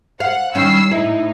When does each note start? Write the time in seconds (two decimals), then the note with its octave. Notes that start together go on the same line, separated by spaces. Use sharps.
0.20 F5 F#5
0.55 D#3 G3 C#4 E6 C7
0.91 A2 D#4 E4